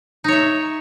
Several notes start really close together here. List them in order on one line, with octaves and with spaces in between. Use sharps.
D#4 C#5 E5